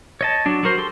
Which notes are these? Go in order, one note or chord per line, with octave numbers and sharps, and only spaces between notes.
C#5 D#5 A5
F#3 D4
F#3 F#4 A#4 C5
G4 A4 C6